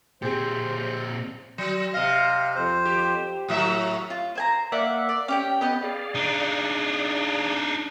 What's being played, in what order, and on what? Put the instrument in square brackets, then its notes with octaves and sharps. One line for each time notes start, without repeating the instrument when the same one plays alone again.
[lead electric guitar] A#2 C4 [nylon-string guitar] G4 G#4 [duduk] C5
[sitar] F#3
[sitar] C3 D#5 [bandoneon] F5
[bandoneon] F2 C5
[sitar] G4
[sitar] A2 F#3 E5 [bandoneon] D#6
[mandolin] F4
C5 G#5 A#5
A#3 D5 E5 F#5
D5
C#4 G4 G5
B3 G4 D#5
[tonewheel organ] G#4 D5 F5
[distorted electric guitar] D4 D#4